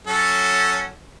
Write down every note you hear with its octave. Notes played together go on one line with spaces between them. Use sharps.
F#3 C#4 A4